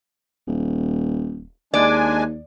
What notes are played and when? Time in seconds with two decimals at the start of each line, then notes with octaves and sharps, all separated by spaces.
0.47 D#1
1.74 D#2 G#3 D4 D5 G#5